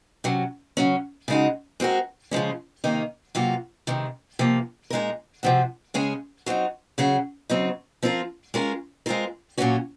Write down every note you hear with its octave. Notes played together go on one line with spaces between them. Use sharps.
C3 F#3 C#4
C#3 F#3 C#4
C#3 G#3 D#4 F#4
G#3 C4 F#4 A#4
C#3 F3 G#3 C#4
C3 D#3 A#3 D#4
C3 F#3 A#3 F4
C3 D#3 G#3
C3 F3 A#3
A#2 G#3 D#4 A#4
C3 F3 C4 F#4
C#3 G#3 C#4 G#4
F#3 C4 D#4
C#3 F#3 C#4 G#4
C#3 F#3 C4 D#4
F3 C4 F4 A#4
G#3 C#4 F4 A#4
G#3 C4 F4 A#4
A#2 F#3 A#3 C#4 F#4